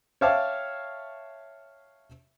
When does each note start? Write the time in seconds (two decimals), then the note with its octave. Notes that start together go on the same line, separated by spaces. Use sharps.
0.21 C#5 E5 F5 G5 A5 D6